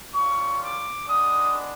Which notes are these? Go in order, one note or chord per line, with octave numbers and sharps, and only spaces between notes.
G3 A#3 C#4 F4 C#6
D6
G#3 B3 D4 D#6